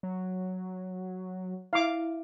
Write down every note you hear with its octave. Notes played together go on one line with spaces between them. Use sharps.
F#3
E4 E5 F5 D6